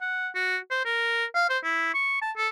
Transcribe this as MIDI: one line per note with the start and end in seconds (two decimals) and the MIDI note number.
0.01 0.28 78
0.35 0.57 66
0.71 0.81 72
0.85 1.25 70
1.35 1.48 77
1.49 1.58 72
1.64 1.89 64
1.94 2.17 85
2.22 2.32 81
2.37 2.49 69